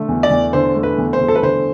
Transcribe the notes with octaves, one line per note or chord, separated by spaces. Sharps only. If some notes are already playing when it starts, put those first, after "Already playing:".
Already playing: D3 A3
E2
D5
E2
D3 C5
A3
B4
E2
C5
E2
A4
B4
D3 C5